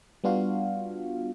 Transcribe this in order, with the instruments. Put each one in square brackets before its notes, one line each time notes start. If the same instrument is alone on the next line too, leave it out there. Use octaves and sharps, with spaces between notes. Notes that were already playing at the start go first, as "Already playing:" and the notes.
[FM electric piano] G3 B3 D4 F4 F#4 F5